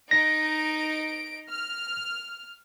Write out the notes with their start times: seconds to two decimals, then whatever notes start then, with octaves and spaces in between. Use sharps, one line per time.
0.11 D#4 A#6 D7
1.49 F6